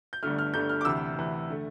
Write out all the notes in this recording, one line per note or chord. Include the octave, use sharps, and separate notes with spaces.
G6
G1 G2 D3 A3 F6
F6
G1 G2 D3 A3 G6
F6
D6
D2 C3 E3 E6
D2 C3 E3
D3 A3